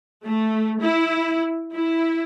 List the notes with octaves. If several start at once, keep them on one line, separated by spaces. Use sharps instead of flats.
A3
E4
E4